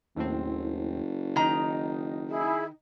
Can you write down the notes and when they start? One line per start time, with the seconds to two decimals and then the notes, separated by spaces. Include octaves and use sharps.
0.16 F#1 D#2 A2 C4
1.36 D#3 D#4 D#5 A#5
2.29 E4 G#4